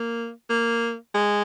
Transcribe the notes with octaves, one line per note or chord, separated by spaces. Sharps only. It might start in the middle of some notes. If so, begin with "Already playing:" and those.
Already playing: A#3
A#3
G#3